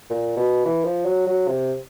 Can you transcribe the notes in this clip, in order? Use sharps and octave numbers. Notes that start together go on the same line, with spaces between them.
A#2
B2
E3
F3
F#3
F#3
C3